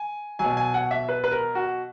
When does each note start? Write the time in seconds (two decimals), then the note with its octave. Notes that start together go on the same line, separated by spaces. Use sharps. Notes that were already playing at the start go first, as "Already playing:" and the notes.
Already playing: G#5
0.39 F#3 G#5
0.45 B2
0.57 G#5
0.74 F#5
0.91 E5
1.09 B4
1.24 B4
1.32 A#4
1.55 F#4